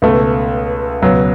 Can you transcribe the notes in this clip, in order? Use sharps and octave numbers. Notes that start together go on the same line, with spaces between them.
C#2 B2 A3
C#2 B2 F#3